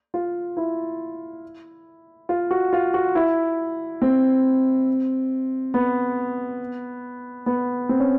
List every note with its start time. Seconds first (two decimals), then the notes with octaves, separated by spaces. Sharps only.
0.14 F4
0.57 E4
2.29 F4
2.51 F#4
2.73 F4
2.94 F#4
3.15 E4
4.02 C4
5.74 B3
7.46 B3
7.89 C4
8.00 C#4